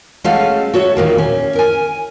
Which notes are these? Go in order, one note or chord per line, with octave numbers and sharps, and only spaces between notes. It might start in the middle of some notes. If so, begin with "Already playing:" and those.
G#3 A3 C#4 F#4 A4 F5
F#4 A4 C#5 E5
A#2 D#3 A#3
C#4
A#4 G#5